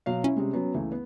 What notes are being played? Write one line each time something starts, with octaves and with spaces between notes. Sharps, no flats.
B2 F#3 F5
C#4 E4
C3 G3 G#3
F#3 B3
C#2 E3 A3
B3